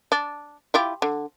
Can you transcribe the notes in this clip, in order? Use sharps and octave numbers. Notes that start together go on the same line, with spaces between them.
D4
E4 F4 G4
D3